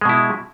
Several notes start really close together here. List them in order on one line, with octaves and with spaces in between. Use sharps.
G#3 B2 E4